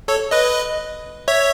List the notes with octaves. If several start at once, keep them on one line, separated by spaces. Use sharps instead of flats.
A4 C#5
B4 D#5
C#5 E5